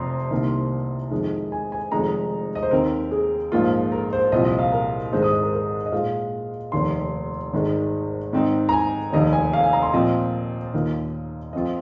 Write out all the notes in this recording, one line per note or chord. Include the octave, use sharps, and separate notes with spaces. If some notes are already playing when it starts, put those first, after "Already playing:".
Already playing: F1 F2 C3 A#5 C6
C2 C3 D#3 A#3
F2 D#3 G#3
G#5
G#5
F1 F2 D#3 G#3 D#4 A#5
D#5
C5
D#2 D#3 C4 A#4
G#4
A#1 G#2 F3 A#3 F4
A#4
C5
C2 A#2 F3 C4 F4 D#5
D#5
F5
A#4
G#1 G#2 G#3 D#4 C5
D#6
D#5
A#4
A#4
D#5
A#2 G#3 F4 F5
F1 D#2 D#3 C6
G#1 G#2 D#3 G#3
G#2 D#3 C4 D#4
A#5
G#5
F1 D#2 D#3 D#5
G#5
F5
G#5
A#5
C6
A#2 F3 C4 F4 D#5
D#2 D#3 A#3 F4
F2 F3 C4 F4 D#5